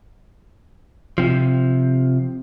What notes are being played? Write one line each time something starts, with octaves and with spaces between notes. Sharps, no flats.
C3 F3